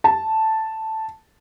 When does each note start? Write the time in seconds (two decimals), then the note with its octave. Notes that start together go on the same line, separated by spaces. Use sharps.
0.04 A5